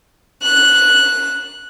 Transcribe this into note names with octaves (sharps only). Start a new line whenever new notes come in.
F#6